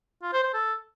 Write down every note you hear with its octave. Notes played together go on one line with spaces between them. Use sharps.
F4
C5
C5
A4